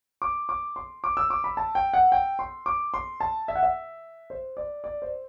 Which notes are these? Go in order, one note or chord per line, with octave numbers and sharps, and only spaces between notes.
D6
D6
C6
D6
E6
D6
B5
A5
G5
F#5
G5
C6
D6
C6
A5
E5
F#5
E5
C5
D5
D5
C5